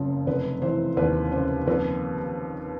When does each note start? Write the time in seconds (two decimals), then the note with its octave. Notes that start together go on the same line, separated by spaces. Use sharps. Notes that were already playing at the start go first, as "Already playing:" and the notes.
Already playing: F#1 F2 C#3 F3
0.27 F1 B4
0.62 E3 C5
0.97 D#2 B4
1.32 C#3 C5
1.67 F2 B4